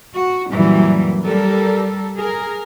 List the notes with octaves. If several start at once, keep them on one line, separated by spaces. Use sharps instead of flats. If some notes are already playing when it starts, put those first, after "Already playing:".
F#4
F#2 A#2 E3 F#3 G3
G3 A4 A#4
G#4 A#4